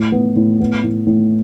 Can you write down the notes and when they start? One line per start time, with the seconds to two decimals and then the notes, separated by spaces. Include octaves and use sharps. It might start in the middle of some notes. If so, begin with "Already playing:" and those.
Already playing: A2
0.12 B3
0.36 A2
0.60 B3
0.84 A2
1.07 A2